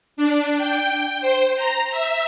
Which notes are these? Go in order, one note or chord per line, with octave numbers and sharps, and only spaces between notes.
D4
G5
C5
A#5
E5